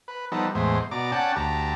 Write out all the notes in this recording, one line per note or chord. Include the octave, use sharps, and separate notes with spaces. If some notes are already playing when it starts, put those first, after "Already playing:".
B4
F3 G3 B3 D#4 A4
E2 A2 G#3 C5
B2 D5 A#5 D6
C#4 D5 F#5 G5 A5
D2 G4 A5 A#5